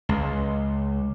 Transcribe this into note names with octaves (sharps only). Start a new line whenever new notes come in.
C#2